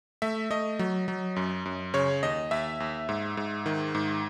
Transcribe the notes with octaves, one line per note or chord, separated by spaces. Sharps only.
A3 E5
A3 D#5
F#3
F#3
F#2
F#2
C#3 C#5
D#2 D#5
D#2 E5
D#2
G#2
G#2
D#3
G#2